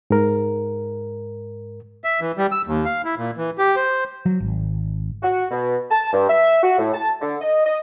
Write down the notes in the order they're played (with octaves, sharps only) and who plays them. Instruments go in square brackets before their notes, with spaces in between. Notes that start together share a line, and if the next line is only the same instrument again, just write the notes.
[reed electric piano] G#2 A#4
[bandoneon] E5
E3
G3
E6
D#2
F5
E4
A#2
E3
G4
C5
[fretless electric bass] F#3
G#1
[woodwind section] F#4
B2
A5
G2
E5
F#4
A2
A5
D3
D#5
D#5